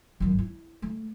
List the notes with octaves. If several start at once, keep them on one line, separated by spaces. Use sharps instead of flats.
G#1 F#2
E4
A3